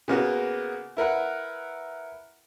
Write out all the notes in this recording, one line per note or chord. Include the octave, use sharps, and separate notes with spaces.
C#3 A#3 B3 F#4
E4 A#4 B4 F#5